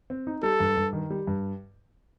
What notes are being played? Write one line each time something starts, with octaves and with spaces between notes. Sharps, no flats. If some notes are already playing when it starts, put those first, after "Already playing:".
C4
D#4
G3 A4
G2
G2
D#3
G3
G2